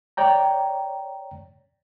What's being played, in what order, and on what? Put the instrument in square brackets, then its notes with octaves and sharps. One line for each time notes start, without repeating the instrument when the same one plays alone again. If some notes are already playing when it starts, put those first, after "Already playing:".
[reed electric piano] C#5 D5 G5 A#5